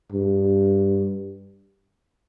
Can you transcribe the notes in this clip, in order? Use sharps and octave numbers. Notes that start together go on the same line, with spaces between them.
G2